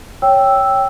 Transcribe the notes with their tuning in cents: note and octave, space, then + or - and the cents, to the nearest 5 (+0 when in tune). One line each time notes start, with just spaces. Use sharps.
C#5 +0 G5 +0 E6 +0